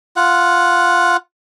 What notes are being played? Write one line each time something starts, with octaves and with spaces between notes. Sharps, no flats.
F4 F#5